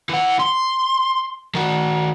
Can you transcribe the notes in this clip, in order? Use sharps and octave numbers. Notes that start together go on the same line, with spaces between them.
E3 F#5
C6
D#3 F#4